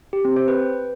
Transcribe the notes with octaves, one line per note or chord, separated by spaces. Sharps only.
G4
C4
C5
B4